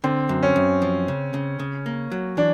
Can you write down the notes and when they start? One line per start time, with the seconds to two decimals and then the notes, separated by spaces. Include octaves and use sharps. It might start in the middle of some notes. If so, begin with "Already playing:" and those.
0.04 D3 C4
0.29 F#2
0.43 C#4
0.56 F#2
0.82 F3
1.08 C#3
1.34 C#3
1.59 C#3
1.86 A#3
2.12 F#3
2.37 E3 D4